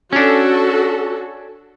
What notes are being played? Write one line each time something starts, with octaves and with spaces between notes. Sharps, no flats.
C#4 D4 F#4 A4